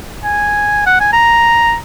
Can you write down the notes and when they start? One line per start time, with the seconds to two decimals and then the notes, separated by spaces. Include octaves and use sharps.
0.24 G#5
0.86 F#5
1.00 G#5
1.13 A#5